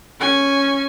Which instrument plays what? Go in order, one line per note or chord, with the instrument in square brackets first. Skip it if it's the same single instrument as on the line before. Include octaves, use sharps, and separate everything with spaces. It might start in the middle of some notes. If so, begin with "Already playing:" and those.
[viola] C#4 G#5